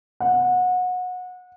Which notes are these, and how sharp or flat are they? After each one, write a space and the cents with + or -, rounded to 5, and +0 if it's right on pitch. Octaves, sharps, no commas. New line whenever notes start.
F#5 -25